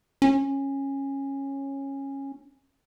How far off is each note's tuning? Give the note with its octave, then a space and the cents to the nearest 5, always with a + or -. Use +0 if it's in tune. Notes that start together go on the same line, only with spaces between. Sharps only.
C#4 -15